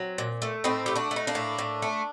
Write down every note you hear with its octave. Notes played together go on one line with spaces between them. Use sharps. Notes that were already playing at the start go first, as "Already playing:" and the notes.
Already playing: F#3 C4
A#2
A3
A2 C4 D#4
A3 G4
D4 F#4
A3
D#4
A#3 D4
A2
A2
A3